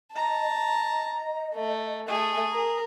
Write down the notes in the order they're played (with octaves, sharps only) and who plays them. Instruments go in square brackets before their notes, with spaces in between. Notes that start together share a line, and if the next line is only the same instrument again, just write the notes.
[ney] D#5 [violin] A5 [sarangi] A#5
[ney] D#5
[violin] A3
[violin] A3 G#5 [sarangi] G#4
[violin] A#4